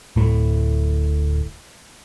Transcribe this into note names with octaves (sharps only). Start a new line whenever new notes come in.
D1 A2